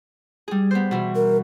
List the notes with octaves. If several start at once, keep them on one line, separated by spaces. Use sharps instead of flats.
G3 G#4
B3 C5
B2 E3
A#4